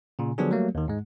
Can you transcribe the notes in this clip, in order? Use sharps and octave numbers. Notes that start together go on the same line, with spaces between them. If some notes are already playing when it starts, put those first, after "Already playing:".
A#2 C#3
D3 F3 F#3 B3 D4 G#4
F#3 G3 A3 A#3
D#2 D#3
G#2 G#3